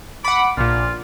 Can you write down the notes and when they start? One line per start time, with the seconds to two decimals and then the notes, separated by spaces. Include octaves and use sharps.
0.25 F#5 B5 D6
0.57 A#1 A#2 F4